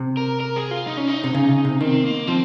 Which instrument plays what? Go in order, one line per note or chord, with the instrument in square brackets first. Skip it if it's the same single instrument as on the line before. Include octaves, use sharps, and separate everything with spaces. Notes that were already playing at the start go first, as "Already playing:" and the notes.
Already playing: [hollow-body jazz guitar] C3
[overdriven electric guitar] A#4
A#4
G#4
F4
D#4
C#4
D#4
[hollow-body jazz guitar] C3
C#3
C#3
C3
[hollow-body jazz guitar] D#3 [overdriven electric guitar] C4
[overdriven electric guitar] A#3
[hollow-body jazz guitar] F3 [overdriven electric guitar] C4